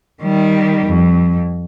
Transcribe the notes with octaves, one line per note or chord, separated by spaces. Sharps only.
D#3 G3
F2